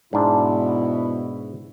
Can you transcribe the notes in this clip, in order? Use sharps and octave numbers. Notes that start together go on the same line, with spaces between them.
G#2 B2 D4 E4